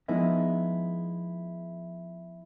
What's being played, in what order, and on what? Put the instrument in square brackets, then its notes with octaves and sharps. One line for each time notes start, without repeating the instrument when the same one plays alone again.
[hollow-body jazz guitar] F3 G#3 B3 D#4 E4